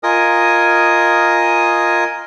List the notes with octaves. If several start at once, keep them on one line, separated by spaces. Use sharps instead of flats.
F4 A#4 D#5 G#5 D#6